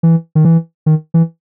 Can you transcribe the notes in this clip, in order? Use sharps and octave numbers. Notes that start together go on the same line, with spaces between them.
E3
D#3
E3
D#3
E3